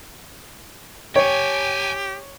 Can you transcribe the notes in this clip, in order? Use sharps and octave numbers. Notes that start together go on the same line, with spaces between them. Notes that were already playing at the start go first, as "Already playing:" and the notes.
G4 C#5 G5 G#5